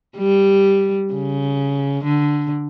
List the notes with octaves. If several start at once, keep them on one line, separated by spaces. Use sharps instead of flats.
G3
C#3
D3